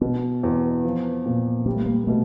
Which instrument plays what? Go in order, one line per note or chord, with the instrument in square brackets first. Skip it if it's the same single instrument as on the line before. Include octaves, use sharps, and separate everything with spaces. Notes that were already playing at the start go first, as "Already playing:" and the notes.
[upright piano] B2 [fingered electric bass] B3
[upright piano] E2
F3
A#2
[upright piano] G3 [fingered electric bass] A#3
[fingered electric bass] A3
A#3
[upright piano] B2 [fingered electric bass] A3